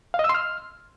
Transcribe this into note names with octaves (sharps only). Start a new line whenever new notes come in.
F5
D#5
E6
C6
F6